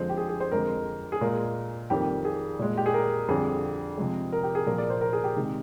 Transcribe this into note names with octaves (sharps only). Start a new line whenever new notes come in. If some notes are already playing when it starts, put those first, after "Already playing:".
Already playing: F2 D3 F3 G#3 C5
G4
G#4
G#4
C5
F2 D3 G#3 A#4
G#4
A#2 G#3 A#4
F2 D#3 G3 A#3 G4
G#4
A#2 G#3
G4
G#4
A#4
F2 D3 G3 G#4
C3 F3 G#3
A#4
G4
G#4
A#2 F3 A#3 A#4
D5
C5
A#4
G#4
G4
C3 D#3 G#3